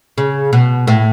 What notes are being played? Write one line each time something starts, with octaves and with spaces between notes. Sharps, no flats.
C#3
B2
A2